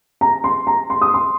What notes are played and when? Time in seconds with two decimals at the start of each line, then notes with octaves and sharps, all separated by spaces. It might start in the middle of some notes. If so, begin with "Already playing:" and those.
0.21 A#5
0.44 C6
0.67 A#5
0.90 C6
1.01 D#6
1.14 C6